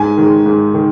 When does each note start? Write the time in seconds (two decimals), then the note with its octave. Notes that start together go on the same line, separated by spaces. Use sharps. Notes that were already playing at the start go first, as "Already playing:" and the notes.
Already playing: G#2 G#5
0.17 D#3 G#3
0.46 G#2
0.74 D#3